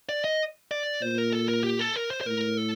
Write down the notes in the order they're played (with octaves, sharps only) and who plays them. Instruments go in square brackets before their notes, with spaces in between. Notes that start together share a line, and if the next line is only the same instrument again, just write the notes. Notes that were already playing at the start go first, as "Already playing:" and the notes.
[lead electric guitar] D5
D#5
D5
[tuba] A#2 [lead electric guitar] C5
[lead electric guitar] A#4
A4
A#4
G4
A4
A#4
C5
C5
[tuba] A2 [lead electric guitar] A#4
[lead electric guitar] A4